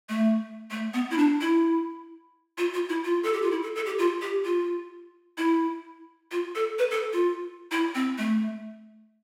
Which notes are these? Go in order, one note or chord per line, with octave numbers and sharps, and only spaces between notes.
A3
A3
B3
E4
D4
E4
F4
F4
E4
F4
A4
G4
F4
E4
A4
A4
G4
F4
G4
F4
E4
F4
A4
B4
A4
F4
E4
C4
A3